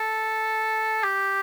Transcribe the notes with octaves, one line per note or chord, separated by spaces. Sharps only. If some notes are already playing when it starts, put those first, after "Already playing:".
Already playing: A4
G4